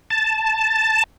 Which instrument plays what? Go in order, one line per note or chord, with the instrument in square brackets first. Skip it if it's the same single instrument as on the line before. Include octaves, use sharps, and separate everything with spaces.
[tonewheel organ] A5